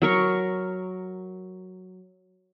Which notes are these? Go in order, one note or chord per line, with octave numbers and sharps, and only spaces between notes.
F#3 A#4 C#6